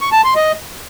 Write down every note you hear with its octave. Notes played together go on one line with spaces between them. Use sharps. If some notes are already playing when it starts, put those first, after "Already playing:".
C#6
A5
C6
D#5